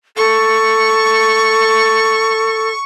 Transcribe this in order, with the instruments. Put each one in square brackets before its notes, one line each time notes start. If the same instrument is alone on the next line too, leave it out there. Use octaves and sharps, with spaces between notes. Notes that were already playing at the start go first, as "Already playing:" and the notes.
[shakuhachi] A4 [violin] C#6